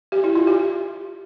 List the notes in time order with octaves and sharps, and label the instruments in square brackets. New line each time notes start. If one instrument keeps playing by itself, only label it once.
[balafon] G4
E4
F4
G4